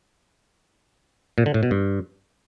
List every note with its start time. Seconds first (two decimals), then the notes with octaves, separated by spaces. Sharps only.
1.38 A#2
1.46 D3
1.54 A2
1.63 B2
1.71 G2